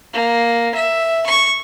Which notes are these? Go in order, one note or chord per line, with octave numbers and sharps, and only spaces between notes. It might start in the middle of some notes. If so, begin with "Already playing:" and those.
A#3
E5
C#6